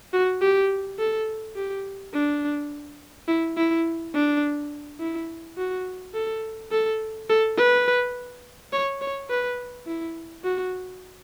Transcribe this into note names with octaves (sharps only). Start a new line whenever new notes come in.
F#4
G4
A4
G4
D4
E4
E4
D4
E4
F#4
A4
A4
A4
B4
C#5
C#5
B4
E4
F#4